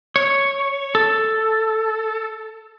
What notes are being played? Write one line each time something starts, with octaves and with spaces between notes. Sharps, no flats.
C#5
A4